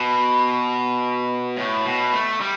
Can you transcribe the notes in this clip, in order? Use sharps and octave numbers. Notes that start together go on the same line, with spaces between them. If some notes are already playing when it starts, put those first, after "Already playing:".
Already playing: B2
A2
B2
A3
G3